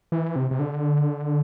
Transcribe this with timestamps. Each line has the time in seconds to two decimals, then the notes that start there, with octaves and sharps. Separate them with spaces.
0.12 E3
0.36 C3
0.51 C3
0.59 D3